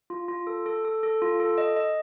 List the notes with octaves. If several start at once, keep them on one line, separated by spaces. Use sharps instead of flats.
F4
F4
A4
A4
A4
A4
F4
A4
D#5
D#5